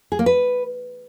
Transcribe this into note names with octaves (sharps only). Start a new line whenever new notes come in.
G#4
A#3
B4